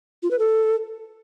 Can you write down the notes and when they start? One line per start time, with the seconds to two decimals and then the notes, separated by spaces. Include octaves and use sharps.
0.23 F4
0.31 B4
0.39 A4